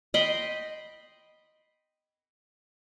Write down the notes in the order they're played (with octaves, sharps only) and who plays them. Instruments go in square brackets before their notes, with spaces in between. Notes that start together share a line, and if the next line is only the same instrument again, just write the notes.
[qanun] D#5 G5 B5 C6